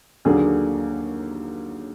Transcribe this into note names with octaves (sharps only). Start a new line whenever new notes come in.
D#2 D3 F#3 A#3 D4 G#4